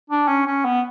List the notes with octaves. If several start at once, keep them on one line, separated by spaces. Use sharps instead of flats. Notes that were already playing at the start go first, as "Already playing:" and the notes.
D4
C#4
C#4
B3